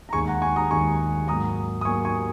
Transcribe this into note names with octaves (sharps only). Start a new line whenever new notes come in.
A#5
D#2 D#3 G#3 G#5 C#6
F#5 A#5
G#5 C#6
A#5 D#6
D#2 D#3 G#3 G#5 C#6
G#2 F#3 A#3 A#5 D#6
D#6
G#2 F#3 A#3 G#5 C#6
G#5 C#6